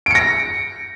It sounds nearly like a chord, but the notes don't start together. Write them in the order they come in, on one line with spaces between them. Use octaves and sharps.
D7 C#7 A#6